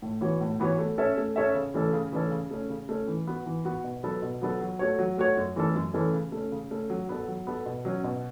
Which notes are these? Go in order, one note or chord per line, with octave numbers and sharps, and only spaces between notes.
A2
E3 B3 F#4 C#5
A2
E3 B3 F#4 C#5
A3
C#4 A4 C#5 E5
A3
C#4 A4 C#5 E5
C#3
E3 A3 C#4 A4
C#3
E3 A3 C#4 A4
C#3
A3 C#4
C#3
A3 C#4
E3
B3 F#4
E3
B3 F#4
B2
F#3 B3 A4
B2
F#3 B3 A4
F#3
A3 F#4 C#5
F#3
A3 F#4 C#5
F#2
E3 A3 C#4 A4
F#2
E3 A3 C#4 A4
C#3
A3 C#4
C#3
A3 C#4
F#3
B3 A4
F#3
B3 A4
B2
F#3 C#4
B2